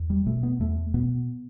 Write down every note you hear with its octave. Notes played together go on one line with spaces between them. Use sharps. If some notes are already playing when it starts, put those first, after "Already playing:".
Already playing: E2
G3
B2 A3
B3
E2 A3
B2 B3